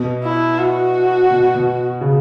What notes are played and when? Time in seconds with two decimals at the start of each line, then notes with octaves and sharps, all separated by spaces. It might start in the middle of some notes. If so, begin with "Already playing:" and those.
Already playing: B2
0.24 E4
0.59 F#4
1.31 B2
1.54 B2
2.01 C#3